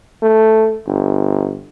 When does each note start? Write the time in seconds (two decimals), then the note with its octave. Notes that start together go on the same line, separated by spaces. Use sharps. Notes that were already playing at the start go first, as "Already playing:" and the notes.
0.22 A3
0.87 G1